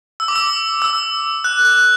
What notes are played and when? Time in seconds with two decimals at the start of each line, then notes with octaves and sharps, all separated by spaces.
0.20 E6
0.28 D6
0.36 E6
0.82 E6
1.44 F#6
1.65 F#6